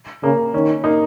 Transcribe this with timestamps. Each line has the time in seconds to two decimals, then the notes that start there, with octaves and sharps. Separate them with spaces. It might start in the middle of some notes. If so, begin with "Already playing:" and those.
0.23 C#3 A#3
0.54 D#3 C#4
0.84 A#3 D#4